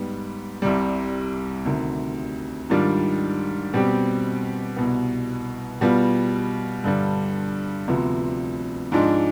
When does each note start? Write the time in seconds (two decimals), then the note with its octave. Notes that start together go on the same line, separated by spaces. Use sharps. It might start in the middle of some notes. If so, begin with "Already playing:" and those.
Already playing: G#2 G3 B3
0.62 C2 C3 G3
1.66 D2 C3 D#3
2.70 G#2 D#3 G3 D4 F4
3.73 B2 G3 C4 G4
4.77 C2 B2 B3
5.81 B2 G3 B3 F4
6.84 G2 D3 G3
7.88 D2 C3 F3 B3
8.92 G#2 F3 G#3 D4